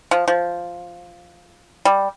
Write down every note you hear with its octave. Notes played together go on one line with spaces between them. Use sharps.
F3
F3
G3